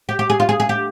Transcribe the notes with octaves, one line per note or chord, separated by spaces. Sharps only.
G4
G4
G#4
F4
G#4
G#4
G4